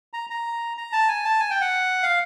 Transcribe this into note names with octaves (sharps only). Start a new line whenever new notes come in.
A#5
A#5
A#5
A5
G#5
A5
G#5
G5
F#5
F5